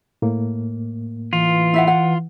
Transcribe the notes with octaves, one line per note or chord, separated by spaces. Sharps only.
A2 A#3
E3 F4
E4 E5 F#5
F#5